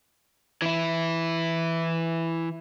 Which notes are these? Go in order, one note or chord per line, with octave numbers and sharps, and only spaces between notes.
E3 E4